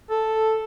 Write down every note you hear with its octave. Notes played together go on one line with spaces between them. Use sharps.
A4